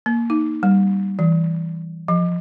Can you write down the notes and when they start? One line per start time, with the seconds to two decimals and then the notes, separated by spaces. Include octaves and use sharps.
0.06 A#3
0.30 D#4
0.63 G3
1.19 E3
2.08 F3